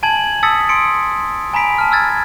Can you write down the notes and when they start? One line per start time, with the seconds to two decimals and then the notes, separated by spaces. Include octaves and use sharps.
0.03 G#5 A5 G#6 F#7
0.43 A5 D#6 E6 A6 B6 C#7
0.69 C6 C#7 D7
1.53 G#5 A#5 B5 B6 D7
1.78 A5 F6
1.92 E6 F6 G#6 A6